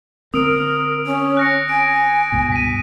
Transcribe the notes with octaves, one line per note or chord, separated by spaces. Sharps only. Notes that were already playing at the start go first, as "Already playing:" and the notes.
D3 C4 A#4 D#6 E6 D7
C#4
F#6 A#6 C#7
G#5 D7
C#2 G2 B2
B6 D#7